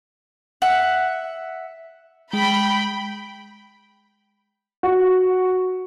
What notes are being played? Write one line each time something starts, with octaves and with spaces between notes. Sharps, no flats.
E5 F#5
G#3 G5 B5
F#4